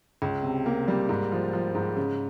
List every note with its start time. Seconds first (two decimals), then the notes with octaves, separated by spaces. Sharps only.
0.22 C#2
0.43 C3
0.66 A#3
0.88 G3
1.09 G#2
1.32 F3
1.53 F3
1.75 G#2
1.97 C#3